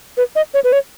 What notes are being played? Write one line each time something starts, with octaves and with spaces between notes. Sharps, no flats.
B4
D#5
C#5
B4
C#5